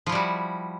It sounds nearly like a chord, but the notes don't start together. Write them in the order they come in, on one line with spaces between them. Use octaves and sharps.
F3 E4 G3 F#4